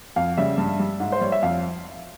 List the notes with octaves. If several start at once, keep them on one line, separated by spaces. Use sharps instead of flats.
F2 F5
C#3 G3 E5
G2
G3
G#2
C5
G3 C#5
E5
F2 F5